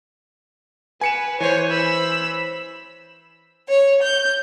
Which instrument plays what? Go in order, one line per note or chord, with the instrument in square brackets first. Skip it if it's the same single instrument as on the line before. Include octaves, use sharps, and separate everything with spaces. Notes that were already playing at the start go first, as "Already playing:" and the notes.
[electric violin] B4 [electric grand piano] G#5 C#7 E7
[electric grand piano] E3 C5 [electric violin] C#5 G#5
[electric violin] B5 E6
[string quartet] C#5
G6